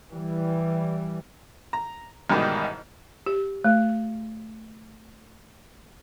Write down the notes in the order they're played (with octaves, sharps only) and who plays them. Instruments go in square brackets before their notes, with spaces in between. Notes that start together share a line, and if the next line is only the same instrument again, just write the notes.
[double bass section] E3 G3
[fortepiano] A#5
A1 G#2 B2 D#3 G3
[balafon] G4
A3